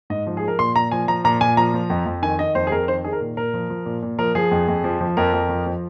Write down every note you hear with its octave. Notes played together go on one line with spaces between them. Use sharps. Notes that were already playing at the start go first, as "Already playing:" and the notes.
G#2 D#5
F3
G#4
F3
A#4
A#2 C6
A#2 A#5
F3 G#5
F3 A#5
A#2 A#5
A#2 G#5
F3 A#5
F3
F2
F2
D#3 G#5
D#3 D#5
F2 C5
G#4
F2 A#4
D#3 C5
D#3 G#4
A#4
A#2
A#2 A#4
F3
F3
A#2
A#2
F3 A#4
F3 G#4
F2
F2
F3
F3
F2 A#4
F2
F3
F3